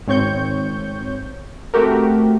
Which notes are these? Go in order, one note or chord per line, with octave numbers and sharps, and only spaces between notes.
G#1 C4 C#5 C#6 G6
A3 C4 F#4 G4 A#4